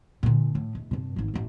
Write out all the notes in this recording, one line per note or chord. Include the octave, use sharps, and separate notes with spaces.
A#2 D3
A2
E1
G2 C3
G#1 A#3
A1 G2